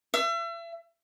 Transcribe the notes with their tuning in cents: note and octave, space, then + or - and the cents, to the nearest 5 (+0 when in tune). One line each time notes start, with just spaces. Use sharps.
E5 +35